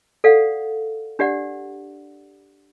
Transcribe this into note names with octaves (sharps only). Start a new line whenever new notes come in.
A4 D5 F5 F#5
D4 G4 D5 F#5